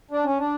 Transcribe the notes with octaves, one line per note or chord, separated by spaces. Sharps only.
D4
C#4
D4